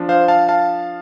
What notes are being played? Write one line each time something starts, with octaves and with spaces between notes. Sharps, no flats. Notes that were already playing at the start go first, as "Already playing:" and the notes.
Already playing: F3 D4
C5 F5
F5 A5
F5 A5